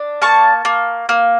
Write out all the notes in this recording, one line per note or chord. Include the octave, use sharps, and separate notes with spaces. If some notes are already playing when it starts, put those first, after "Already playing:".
Already playing: D4
A#3 A5 C#6
A#3
A#3